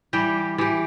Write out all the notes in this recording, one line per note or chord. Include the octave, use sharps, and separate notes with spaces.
E3 G3 G4
E3 G4